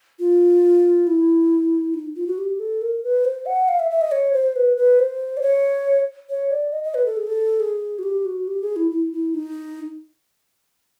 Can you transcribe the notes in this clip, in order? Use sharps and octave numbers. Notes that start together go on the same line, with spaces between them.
F4
E4
D#4
F4
F#4
G4
A4
A#4
B4
C5
F#5
F5
E5
E5
D#5
C#5
C5
B4
B4
C5
D5
C#5
C#5
D5
D#5
D#5
B4
A4
G#4
A4
G#4
F#4
G4
F#4
G4
G#4
E4
E4
E4
D#4